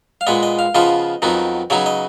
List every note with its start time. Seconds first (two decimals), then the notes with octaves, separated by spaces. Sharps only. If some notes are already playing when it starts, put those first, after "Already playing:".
0.21 F5
0.27 A#2 G#3 B3 D#5
0.43 D#5
0.59 F5
0.75 C#3 F3 B3 F4 D#5
1.22 F2 D#3 F#3 B3 D#4
1.70 C#3 F#3 B3 D#4 C#5
1.86 D#5